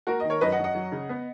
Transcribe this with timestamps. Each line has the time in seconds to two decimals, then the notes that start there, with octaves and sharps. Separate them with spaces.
0.07 A#3 F#4 A#4
0.20 D#3 D#5
0.30 A#4 C#5
0.41 F#2 B4 D#5
0.52 D#5 F#5
0.59 F#2
0.64 D#5 F#5
0.75 F#3
0.92 C#3
1.09 B3